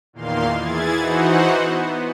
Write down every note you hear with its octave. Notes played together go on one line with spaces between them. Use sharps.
E2 A#2 D#3 A#3 F5 C6
E3 E4 G#4 G#6 A6
E3 D#4 F#4 C5 F#5
B3